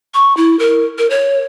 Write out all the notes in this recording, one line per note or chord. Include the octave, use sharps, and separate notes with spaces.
C#6
E4
A#4
A#4
C#5